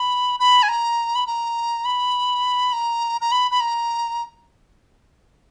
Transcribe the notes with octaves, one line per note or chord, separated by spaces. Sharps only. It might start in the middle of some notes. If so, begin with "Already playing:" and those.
Already playing: B5
B5
G#5
A#5
B5
A#5
B5
A#5
A#5
B5
B5
A#5